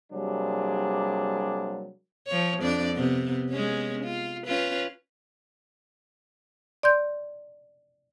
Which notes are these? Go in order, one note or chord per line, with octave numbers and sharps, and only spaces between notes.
C3 F#3 G3 A#3 D4 G#4
F3 C#5
F2 D4 D5
C3 B3
G#3 B3 C#4
F4
C#4 F4 B4
D5 C6 G6